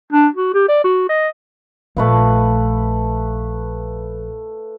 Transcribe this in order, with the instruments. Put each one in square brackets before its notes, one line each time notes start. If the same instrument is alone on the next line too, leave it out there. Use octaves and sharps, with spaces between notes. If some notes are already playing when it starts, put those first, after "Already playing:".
[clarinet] D4
F#4
G4
D5
F#4
D#5
[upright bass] A#1 [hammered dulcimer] A3 B4 F5